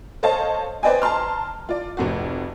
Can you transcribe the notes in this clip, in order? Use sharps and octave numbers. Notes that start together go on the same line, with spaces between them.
A4 C5 C#5 D#5 F5 A5
B4 C5 D5 D#5 G5 G#5
A5 A#5 C6 F6
F4 D5
F1 F2 F#4